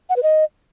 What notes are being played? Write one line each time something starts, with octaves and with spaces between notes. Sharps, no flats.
F#5
B4
D#5